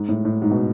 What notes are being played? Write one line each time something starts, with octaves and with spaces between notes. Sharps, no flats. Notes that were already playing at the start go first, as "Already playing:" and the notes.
Already playing: G#2
A2
A2
G#2
B2